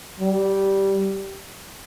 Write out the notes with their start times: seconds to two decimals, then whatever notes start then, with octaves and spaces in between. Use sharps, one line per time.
0.20 G3